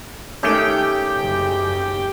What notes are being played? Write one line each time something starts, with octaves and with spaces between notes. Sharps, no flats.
D#3 A3 C#4 G4 G5
F#1 C#3